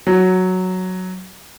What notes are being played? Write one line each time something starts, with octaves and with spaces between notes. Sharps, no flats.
F#3